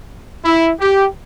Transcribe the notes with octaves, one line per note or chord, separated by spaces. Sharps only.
E4
G4